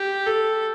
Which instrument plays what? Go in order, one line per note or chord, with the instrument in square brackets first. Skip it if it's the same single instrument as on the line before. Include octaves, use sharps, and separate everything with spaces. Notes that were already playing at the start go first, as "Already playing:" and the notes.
Already playing: [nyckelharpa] G4
A4